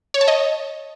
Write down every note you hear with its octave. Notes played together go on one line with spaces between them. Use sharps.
C#5
A5
D#5